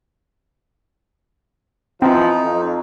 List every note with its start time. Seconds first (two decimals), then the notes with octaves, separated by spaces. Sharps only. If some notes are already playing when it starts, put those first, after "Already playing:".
2.02 E3 F3 C4 D#4
2.42 F2